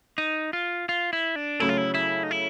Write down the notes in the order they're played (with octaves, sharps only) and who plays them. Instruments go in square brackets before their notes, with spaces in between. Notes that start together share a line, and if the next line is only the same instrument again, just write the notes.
[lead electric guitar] D#4
F4
F4
E4
D4
[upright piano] C#3 F#3 A3 [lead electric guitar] E4
[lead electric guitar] F4
E4
E4
D#4
E4